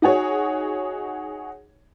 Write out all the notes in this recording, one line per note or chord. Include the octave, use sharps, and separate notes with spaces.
D#4 F#4 G#4 C#5